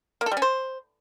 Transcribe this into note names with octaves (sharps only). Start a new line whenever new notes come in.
A#3
A4
G3
C#4
C5